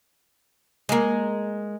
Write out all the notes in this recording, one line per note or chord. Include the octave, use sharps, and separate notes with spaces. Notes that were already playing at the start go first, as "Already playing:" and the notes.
G#3 A#3